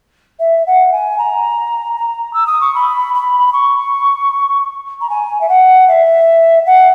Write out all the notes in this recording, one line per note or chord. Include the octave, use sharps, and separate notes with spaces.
E5
F#5
G#5
A#5
A#5
E6
D#6
C#6
B5
B5
B5
C#6
A#5
G#5
E5
F#5
E5
F#5